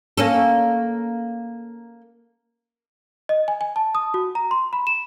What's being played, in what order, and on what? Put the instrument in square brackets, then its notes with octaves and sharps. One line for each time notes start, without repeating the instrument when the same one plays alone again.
[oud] A#3 C#4 A4
[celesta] D#5
G#5
G#5
A5
D#6
F#4
A#5
C6
B5
E7